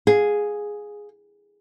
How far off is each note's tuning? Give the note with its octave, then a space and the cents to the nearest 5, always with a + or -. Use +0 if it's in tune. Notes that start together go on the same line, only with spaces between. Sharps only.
G#4 +0 F5 +25